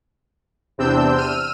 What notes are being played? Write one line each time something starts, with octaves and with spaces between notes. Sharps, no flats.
E2 C3 C4 D4 E6 G6
E6 F6 D#7